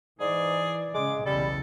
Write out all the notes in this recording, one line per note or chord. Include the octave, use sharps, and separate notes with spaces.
G#2 E3 G#4 D5
G#2 C#3 G#3 D6
B1 E2 C#3 G3 A4 B5